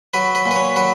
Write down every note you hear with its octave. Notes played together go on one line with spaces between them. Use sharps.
F#3 B4
B4
A#2
B4
C#5
F#3 B4